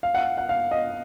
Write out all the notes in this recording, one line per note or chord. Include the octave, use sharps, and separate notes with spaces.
F5
F#5
F#5
F5
D#5